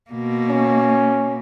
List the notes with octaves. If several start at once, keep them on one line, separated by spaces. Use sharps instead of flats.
B2 A#3
C#4